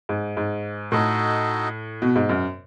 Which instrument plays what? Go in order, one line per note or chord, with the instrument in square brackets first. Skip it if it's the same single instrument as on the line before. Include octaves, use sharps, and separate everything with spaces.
[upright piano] G#2
G#2
[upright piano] A2 [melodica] D#4 F#4 A4 D#5
[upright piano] B2
G#2
F#2